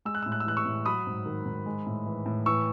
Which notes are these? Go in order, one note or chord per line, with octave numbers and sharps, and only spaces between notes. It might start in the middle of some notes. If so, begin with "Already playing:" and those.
G#3 E6
F#6
E6
A2
F#6
E6
E3 F#6
C#6 E6
A2
F#3 B5 D#6
G#2
D#3
G#2
G#3
A2
E3
A2
E3 C#6 E6